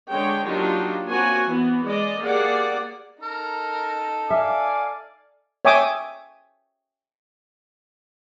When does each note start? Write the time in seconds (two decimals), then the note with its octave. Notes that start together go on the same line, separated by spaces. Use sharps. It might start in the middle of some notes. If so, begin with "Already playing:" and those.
0.10 D3 G#3 C#5 G5
0.46 F#3 A#3 D4 D#4 F4 G4
1.09 A#3 C4 F#4 C#5 G#5
1.45 E3 B3
1.87 G#3 D5 D#5
2.21 A#3 G4 G#4 D5 F#5
3.22 D#4 A4 A#4
4.30 D5 E5 F5 G#5 D6
5.65 C#5 E5 G5 G#5 D6 D#6